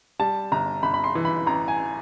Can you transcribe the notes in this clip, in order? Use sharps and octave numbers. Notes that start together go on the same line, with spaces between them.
G3 A5
G1 A#5
G1 B5
B5
C6
E3
B5
A1 A#5
G#5